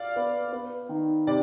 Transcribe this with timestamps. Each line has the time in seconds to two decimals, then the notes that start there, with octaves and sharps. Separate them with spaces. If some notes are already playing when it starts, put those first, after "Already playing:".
Already playing: D5 F5
0.16 B3
0.53 B3
0.89 D#3
1.27 C3 D5